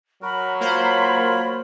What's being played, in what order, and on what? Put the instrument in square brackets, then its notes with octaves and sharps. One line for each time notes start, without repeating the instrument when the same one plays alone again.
[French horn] F#3 [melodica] F#4 A#4 [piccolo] B5
[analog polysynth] A#3 C5 [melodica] F4 A#4 C#5